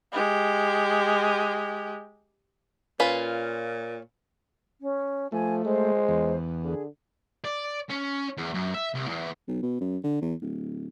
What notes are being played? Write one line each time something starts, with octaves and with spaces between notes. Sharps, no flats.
G#3 G4
A#2 C#4 F4 B4
C#4
F3 A3 G#5
G#3 C5
E2
D3 G#4
D5
C#4
E2
F#2
E5
C2
E2
B1
B2
F#2
D3
E2
D1